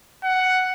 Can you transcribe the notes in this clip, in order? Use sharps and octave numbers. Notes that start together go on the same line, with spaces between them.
F#5